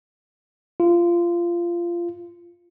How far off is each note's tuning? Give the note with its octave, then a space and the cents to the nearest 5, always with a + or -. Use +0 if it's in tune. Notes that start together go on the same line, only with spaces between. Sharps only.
F4 -20